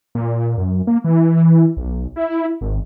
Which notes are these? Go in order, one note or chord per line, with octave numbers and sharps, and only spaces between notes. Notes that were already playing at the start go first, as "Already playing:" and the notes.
A#2
F#2
A#3
E3
B1
E4
G#1